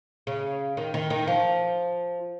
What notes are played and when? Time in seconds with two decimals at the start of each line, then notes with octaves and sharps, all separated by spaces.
0.27 C#3
0.77 D#3
0.94 D#3
1.10 D#3
1.27 F3